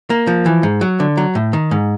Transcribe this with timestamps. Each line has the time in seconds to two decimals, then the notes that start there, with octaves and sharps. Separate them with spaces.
0.10 A#3
0.27 F3
0.46 E3
0.63 G#2
0.81 F#3
1.00 D3
1.17 F#3
1.35 A2
1.53 D#3
1.71 G#2